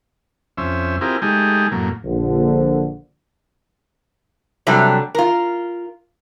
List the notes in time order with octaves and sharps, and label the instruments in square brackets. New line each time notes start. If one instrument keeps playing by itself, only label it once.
[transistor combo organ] F2 C#4 C5 E5
C4 E4 F4 G4 G#4 A#4
G#3 A3 D#4 G4 G#4
F#2 A2 A#3
[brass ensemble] A#1 D3
[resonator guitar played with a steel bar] C3 F#3 G3 A3 D4
F4 A#4